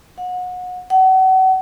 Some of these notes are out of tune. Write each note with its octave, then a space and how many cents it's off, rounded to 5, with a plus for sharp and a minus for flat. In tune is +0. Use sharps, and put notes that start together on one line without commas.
F#5 -30
F#5 +35